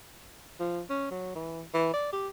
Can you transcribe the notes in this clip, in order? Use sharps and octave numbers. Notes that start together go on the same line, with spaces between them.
F3
C#4
F#3
E3
E3
D5
G4